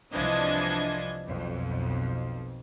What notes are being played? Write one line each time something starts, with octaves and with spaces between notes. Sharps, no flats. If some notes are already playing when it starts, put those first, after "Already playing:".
C2 E3 F3 D4 D#5 G#6
B1 F2